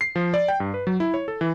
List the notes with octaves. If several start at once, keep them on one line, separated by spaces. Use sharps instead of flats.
C7
F3
D5
G5
G2
B4
F#3
E4
C#5
A4
E3